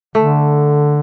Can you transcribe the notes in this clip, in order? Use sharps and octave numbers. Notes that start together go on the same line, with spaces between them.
D3 A3